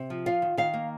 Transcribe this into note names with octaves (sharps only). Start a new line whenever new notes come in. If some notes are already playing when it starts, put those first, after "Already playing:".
Already playing: C3
F3
F4 F5
D#3
D#3 F5
A#3